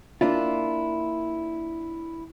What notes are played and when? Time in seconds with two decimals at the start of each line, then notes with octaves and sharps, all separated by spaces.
0.21 A#3 D4 E4 F4